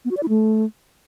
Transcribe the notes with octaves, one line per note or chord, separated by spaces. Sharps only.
B3
F#4
D5
E4
A3